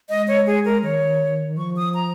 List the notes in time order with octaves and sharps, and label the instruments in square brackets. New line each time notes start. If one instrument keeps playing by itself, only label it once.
[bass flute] G#3 [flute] D#5
[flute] C#5
G#4
A#4
[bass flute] D#3 [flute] C#5
[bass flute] F3 [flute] C#6
[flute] D#6
A#5